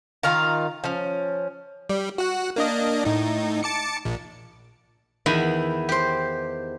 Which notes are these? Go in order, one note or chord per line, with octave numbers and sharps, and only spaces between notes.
D#3 F4 F5 A#5
F3 C#4
G3
F#4 F#5
A#3 D4 D#5
A2 D#4
A5 D6 C#7
A#1
E2 D#3 E4
G4 C5